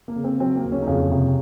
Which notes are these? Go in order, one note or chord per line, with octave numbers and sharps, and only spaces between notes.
A#3
C#3
C4
F#3 C4
A#3
D#2
C#3 C#4
D#4
F2 C#3 C#4
C3